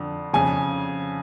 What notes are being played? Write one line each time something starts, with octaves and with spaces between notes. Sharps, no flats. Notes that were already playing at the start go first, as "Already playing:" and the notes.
Already playing: F2 D3
F2 C#3 G#5